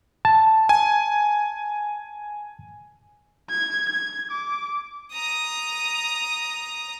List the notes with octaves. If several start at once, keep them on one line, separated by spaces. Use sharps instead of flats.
A5
G#5
G#6
G#6
D6
A#5 D#6